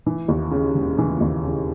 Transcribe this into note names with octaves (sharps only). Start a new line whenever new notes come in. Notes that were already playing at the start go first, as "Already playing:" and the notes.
E3
D#2
C#3
E1
E3
D#2
C#3